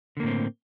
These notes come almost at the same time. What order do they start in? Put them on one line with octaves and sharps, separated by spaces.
D3 A#3 A2 C4